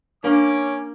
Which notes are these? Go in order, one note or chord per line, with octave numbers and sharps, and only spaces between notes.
A#3 C#4 D4 D6